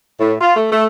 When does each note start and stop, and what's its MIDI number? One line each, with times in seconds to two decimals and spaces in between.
0.19 0.33 45
0.40 0.56 65
0.57 0.67 57
0.71 0.86 57